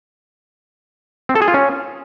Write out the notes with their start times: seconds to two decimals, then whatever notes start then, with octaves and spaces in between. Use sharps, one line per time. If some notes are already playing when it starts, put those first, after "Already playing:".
1.29 C4
1.35 A4
1.42 G#4
1.48 F4
1.54 C#4